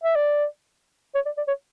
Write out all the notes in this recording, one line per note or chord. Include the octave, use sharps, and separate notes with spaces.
E5
D5
C#5
D5
D5
C#5